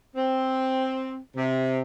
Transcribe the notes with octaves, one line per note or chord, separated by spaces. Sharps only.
C4
C3